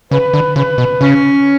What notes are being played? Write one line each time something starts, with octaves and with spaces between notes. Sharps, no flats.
C#3 B4
D3
C#3 B4
B2
C#3 C#4